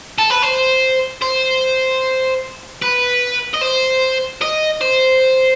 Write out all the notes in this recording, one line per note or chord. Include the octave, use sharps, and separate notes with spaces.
A4
B4
C5
C5
B4
D#5
C5
D#5
C5